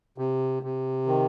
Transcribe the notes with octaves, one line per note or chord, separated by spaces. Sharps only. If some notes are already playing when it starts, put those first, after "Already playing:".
C3
C3
D#3